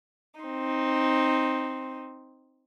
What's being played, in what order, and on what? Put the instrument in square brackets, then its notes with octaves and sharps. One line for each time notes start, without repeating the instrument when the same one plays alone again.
[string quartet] C4 D#4